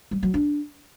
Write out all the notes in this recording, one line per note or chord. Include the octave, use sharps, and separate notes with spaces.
G3
F#3
D4